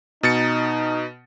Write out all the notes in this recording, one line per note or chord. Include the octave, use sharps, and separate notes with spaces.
B2 D#4 A6 C#7